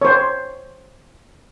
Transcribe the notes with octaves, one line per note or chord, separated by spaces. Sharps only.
C5 C#5